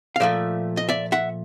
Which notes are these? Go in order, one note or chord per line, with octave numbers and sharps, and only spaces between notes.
F5
A#2 F3 A3 D5 E5
D#5
D5 E5
E5 F#5